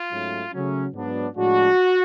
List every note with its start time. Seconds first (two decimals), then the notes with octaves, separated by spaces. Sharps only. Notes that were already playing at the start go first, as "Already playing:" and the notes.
Already playing: F4
0.10 G#2 F#3 A3 C#4
0.52 C#3 F#3 A3 C#4
0.94 G#2 F#3 B3 D4
1.36 A2 F3 G#3 D4 F#4